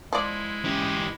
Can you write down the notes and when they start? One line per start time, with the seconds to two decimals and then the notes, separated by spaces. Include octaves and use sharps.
0.13 F3 G#3 E4 D5
0.65 E3 C#4 G4